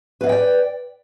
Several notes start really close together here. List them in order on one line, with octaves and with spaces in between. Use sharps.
B4 F5 D#5 G5 D5